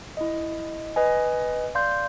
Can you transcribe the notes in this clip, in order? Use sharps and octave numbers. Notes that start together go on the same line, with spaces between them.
E4 D#5
B4 D#5 G#5
D5 F5 C6 G6